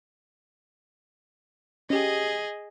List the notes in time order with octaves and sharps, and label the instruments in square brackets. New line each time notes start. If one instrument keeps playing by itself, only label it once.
[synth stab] C#4 G4 [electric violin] G#4 D#5